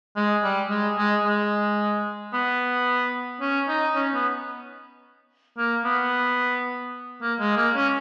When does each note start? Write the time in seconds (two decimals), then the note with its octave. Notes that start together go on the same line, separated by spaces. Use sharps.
0.16 G#3
0.44 G3
0.70 G#3
0.98 G#3
1.25 G#3
2.33 B3
3.41 C#4
3.68 D#4
3.95 C#4
4.14 B3
5.58 A#3
5.85 B3
7.22 A#3
7.40 G#3
7.57 A#3
7.75 C#4